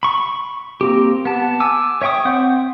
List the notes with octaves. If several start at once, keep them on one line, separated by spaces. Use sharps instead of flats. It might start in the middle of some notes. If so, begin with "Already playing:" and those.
B5 C#6
A#3 C4 G4
B3 A5
G#5 D6 E6
C#5 E5 G5 C#6 D#6
C4 F#5 G6